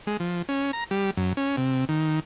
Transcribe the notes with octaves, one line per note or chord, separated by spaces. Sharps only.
G#3
F3
C#4
A#5
G3
F#2
C#4
C3
D#3